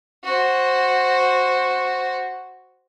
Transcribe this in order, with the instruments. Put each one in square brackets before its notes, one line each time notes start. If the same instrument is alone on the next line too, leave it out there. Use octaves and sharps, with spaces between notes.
[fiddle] F#4 C5